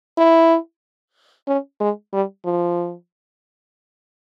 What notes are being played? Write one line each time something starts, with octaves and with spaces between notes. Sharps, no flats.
E4
C#4
G#3
G3
F3